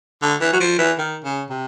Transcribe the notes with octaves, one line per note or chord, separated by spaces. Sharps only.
D3
E3
F#3
F3
E3
D#3
C#3
C3